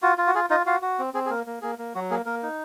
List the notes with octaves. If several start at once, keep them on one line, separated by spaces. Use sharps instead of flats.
F4 F#4
F4
F#4
F4 G#4
D#4 F4 D#5
F4 F#4 F5
F#4
C4
C4 G#4
G#4
A#3 A#4
A#3
A#3 G#4
A#3
F#3 F#4
A#3 G#4
A#3 A#4
D#4